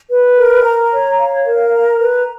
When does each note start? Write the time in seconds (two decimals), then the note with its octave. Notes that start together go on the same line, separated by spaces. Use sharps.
0.10 B4
0.37 A#4
0.64 A#5
0.91 C#5
1.18 F5
1.45 A#4
1.72 A#5
1.99 B4